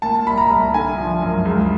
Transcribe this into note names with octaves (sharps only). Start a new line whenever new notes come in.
A#2 A5
C2 B5
A#5
C2
D3 G#5
F3
F#2
C#2